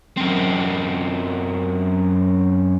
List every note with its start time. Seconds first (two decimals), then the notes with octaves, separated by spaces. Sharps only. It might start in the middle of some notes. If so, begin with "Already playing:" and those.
0.17 F#2 C4